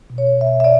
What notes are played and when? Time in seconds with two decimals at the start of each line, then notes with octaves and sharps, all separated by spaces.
0.10 B2
0.18 C#5
0.41 B2 E5
0.60 E5
0.64 D5